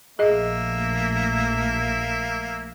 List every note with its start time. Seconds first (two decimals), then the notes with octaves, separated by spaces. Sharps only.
0.19 A#1 A3 A#3 G#4 D#5 E5